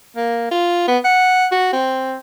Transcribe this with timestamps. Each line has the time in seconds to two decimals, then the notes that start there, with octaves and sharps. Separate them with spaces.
0.16 A#3
0.51 F4
0.88 B3
1.04 F#5
1.52 F#4
1.73 C4